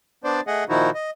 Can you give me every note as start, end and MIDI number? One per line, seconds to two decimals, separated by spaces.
0.24 0.41 59
0.24 0.41 62
0.24 0.41 72
0.24 0.41 74
0.47 0.64 57
0.47 0.64 68
0.47 0.64 75
0.47 0.64 78
0.69 0.90 46
0.69 0.90 51
0.69 0.90 53
0.69 0.90 63
0.69 0.90 64
0.69 0.90 66
0.94 1.11 75